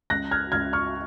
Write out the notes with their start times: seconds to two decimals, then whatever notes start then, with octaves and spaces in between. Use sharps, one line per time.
0.10 C#2 F#6 A#6
0.31 F6 G#6
0.52 C#2 F6 G#6
0.73 C#6 F6